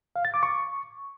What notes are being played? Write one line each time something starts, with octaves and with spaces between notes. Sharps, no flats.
F5
A6
D6
C#6